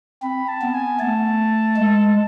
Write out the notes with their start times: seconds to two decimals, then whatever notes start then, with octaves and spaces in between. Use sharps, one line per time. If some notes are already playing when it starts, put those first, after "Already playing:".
0.23 C4 B5
0.49 A5
0.61 B3
0.74 G#5
1.00 A3 A5
1.77 G#3